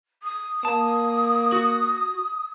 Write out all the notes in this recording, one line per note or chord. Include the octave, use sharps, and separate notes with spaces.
D#6
A#3 A5
F#4